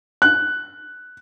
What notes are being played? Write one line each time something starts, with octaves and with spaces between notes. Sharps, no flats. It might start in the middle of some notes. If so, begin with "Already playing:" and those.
F#6